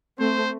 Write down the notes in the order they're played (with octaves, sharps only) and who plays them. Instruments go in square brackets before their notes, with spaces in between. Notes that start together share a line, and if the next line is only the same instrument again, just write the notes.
[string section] A3 C4 [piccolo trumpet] C5